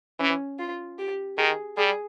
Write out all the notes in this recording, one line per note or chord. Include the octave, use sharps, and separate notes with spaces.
E3 C#4
F4
G4
D#3 G#4
G3 G#4